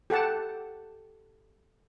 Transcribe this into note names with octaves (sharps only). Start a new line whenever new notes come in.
G4 A4 F#5 A5